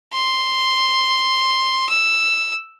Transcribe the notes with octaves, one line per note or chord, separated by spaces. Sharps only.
C6
E6